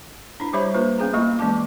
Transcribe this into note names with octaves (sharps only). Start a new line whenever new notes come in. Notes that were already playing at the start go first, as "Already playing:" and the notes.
D4 E4
G3 G4 C5 C#5 E5 B5
A#3 D4 F4 B4 C5
B3 C#4 G#4 A#5
A3 A#3 E4 F4 D#5 C#6
E3 G#3 A#3 C#4 A5 D6